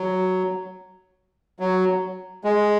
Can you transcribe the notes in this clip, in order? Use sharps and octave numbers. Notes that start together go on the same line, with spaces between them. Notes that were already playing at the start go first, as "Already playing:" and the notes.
Already playing: F#3
F#3
G#3